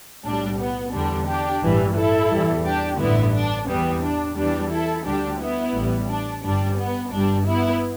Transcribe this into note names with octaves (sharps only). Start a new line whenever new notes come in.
B1 A2 G3 D4
B3
E2 D3 G3 D4
D4 G4
A1 G2 E3 G3
E4 A4
E2 E3 G3
D4 G4
A1 G2 D3 B3 E4
D4
E2 E3 G3 B3
D4
E2 E3 G3 D4 G4
E4 A4
D2 D3 G3 D4 G4
B3 E4
A1 A2 G3
D4
G1 G2 G3 D4
B3
G1 G2 G3 D4
B3 E4